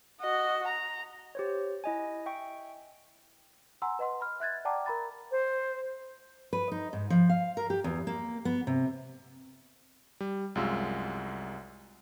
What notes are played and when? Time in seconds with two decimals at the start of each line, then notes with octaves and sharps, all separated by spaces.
0.21 F#4 D#5
0.67 A#5
1.35 G4 C5 C#5
1.84 E4 D#5 G#5
2.26 E5 G5 C#6
3.82 F#5 G#5 A#5 C6 E6
3.99 B4 D#5 F#5 C6
4.21 B5 F6
4.40 E5 F#6 G#6 A6
4.65 D5 F#5 G5 A5 A#5 D6
4.86 A#4 A#5 B5 A6
5.31 C5
6.53 B4
6.72 D#4
6.93 G#2
7.10 F3
7.29 F5
7.57 A#4
7.70 G4
7.84 E2
8.07 A#3
8.45 B3
8.67 C3
10.20 G3
10.55 C2 F#2 G#3 F4 E6